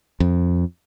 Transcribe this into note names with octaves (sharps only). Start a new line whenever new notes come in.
F2